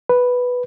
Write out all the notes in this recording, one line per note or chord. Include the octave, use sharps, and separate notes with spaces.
B4